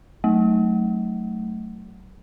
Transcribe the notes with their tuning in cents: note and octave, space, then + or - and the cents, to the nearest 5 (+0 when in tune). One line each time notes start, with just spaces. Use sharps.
F#3 +20 A3 +0